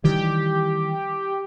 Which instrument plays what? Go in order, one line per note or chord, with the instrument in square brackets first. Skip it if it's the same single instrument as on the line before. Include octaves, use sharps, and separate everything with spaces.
[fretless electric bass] D#3 E3 G3 [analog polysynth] G4